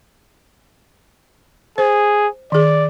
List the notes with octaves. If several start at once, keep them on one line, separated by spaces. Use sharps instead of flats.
G#4 C5
D#3 G#4 D5